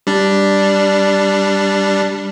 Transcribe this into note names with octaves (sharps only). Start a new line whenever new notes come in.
G3 D4